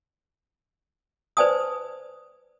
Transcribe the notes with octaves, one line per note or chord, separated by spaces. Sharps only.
B4 C5 D5 G#5 A5 D#6